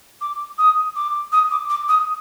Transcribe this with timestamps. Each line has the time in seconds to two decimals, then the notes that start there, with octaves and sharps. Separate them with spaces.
0.21 D6
0.58 D#6
0.95 D6
1.32 D#6
1.50 D6
1.69 D6
1.88 D#6